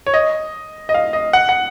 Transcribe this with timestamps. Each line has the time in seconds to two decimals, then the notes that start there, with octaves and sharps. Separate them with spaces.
0.06 C#5
0.14 D#5
0.89 D#5
0.94 F5
1.13 D#5
1.33 F#5
1.49 F#5